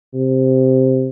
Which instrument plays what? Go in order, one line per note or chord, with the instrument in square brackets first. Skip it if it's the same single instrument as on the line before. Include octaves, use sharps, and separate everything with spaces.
[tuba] C3